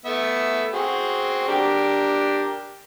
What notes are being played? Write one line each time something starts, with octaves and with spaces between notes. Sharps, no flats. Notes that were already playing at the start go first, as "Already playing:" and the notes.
A3 B3 E5
C4 F#4 G#4
D4 G4 A#4